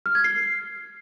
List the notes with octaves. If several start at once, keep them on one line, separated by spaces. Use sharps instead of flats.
F6
G#6
C7